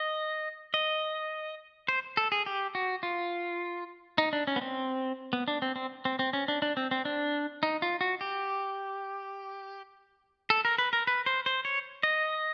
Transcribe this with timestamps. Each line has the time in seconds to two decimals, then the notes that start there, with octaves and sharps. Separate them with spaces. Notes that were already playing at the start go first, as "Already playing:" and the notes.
Already playing: D#5
0.74 D#5
1.88 C5
2.17 A4
2.32 G#4
2.46 G4
2.75 F#4
3.03 F4
4.18 D#4
4.33 D4
4.47 C#4
4.56 B3
4.61 C4
5.33 B3
5.48 D4
5.62 C4
5.76 C4
6.05 C4
6.19 C4
6.33 C#4
6.48 D4
6.62 D4
6.77 C4
6.91 C4
7.05 D4
7.63 D#4
7.82 F4
8.01 F#4
8.21 G4
10.50 A4
10.65 A#4
10.78 B4
10.93 A#4
11.07 B4
11.26 C5
11.46 C5
11.65 C#5
12.03 D#5